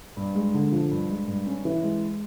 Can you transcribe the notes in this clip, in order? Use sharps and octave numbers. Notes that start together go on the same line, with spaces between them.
G2
G#3
D3
F3
G2
G#3
G2
C#4
E3
G#3